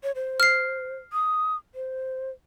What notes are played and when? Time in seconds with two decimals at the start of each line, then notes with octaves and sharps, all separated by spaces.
0.03 C#5
0.15 C5
0.40 F6 C7
1.13 D#6
1.75 C5